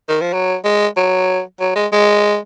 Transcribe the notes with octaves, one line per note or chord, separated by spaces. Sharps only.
D#3
F3
F#3
G#3
F#3
F#3
G#3
G#3